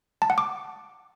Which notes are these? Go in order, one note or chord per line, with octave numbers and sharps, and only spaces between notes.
A5
F#5
D6